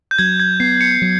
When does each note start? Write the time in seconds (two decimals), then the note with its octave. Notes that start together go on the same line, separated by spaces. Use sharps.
0.11 G6
0.18 F#3 G#6
0.40 G#6
0.60 B3 C7
0.81 C#7
1.02 F#3